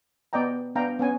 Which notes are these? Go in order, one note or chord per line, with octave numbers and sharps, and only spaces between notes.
B3 D5 D#5 G5 A#5
B3 D4 F5 G5 A#5
B3 C#4 G#5